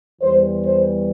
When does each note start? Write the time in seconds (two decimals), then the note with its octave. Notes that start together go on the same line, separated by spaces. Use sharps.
0.21 E2 E3 G3 C5
0.63 C5